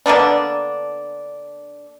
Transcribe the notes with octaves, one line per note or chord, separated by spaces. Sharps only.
D3 A#3 B3 D4